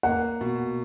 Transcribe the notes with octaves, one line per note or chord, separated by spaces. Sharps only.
A#3 F#5
B2